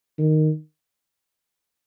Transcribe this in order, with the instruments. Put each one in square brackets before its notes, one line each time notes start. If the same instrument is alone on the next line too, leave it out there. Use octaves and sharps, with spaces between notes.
[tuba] D#3